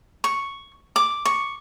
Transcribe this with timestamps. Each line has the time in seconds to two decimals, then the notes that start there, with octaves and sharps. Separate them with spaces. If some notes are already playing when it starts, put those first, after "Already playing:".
0.24 C#6
0.96 D6
1.25 C#6